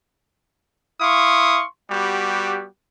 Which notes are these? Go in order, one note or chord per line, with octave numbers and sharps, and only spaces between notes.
E4 F5 C6 C#6 D#6
G3 B3 F#4 G4